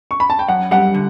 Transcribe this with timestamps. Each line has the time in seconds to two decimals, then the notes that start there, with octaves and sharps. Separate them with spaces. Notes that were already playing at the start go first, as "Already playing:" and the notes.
0.11 C#6
0.20 B5
0.30 A5
0.39 G5
0.48 F#2 F#5
0.71 G3 F#5
0.94 D3